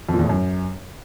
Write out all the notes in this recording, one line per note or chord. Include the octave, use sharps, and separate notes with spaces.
F2
A#2
E2
A2
F#2